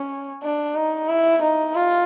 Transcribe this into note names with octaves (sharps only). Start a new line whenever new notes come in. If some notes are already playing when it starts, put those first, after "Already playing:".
Already playing: C#4
D4
D#4
E4
D#4
F4